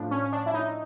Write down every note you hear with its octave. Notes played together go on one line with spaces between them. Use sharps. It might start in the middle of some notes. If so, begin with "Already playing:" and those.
Already playing: A2 F3 D4
C#4
C#4
D4
E4
D#4